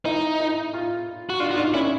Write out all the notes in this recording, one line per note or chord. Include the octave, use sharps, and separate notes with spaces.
D#4 E4
E4
F4
F#4
D4 F4
F#4
D#4
D4 F4
C#4 E4